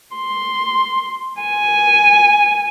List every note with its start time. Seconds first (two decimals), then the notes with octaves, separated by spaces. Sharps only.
0.16 C6
1.41 G#5